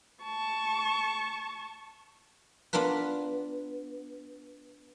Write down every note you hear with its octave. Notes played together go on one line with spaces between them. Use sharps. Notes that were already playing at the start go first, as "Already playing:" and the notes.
A5 C#6
B3 D4 F4 A#4 B4